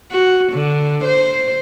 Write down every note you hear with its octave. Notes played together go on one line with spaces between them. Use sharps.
F#4
D3
C5